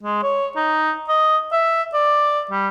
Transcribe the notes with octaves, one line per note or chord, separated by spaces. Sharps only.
G#3
C#5
D#4
D#5
E5
D5
G3